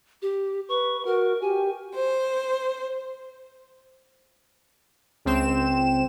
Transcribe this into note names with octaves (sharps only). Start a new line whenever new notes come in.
G4
B4 C#6
F#4 A#4
G4 G#5
C5
C#2 C4 E7